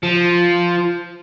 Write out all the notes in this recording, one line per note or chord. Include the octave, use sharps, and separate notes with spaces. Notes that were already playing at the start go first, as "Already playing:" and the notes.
F3